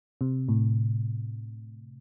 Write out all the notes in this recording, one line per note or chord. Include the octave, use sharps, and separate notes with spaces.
C3
A2